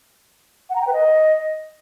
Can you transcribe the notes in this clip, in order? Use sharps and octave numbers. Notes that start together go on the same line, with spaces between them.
F#5
A#5
G5
B4
D#5